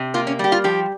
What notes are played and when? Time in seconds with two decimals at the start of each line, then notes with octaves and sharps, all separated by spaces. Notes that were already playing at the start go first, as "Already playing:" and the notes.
Already playing: C3
0.14 A#3 F4
0.27 C#4
0.39 G3 G4
0.52 F4
0.64 F3 G4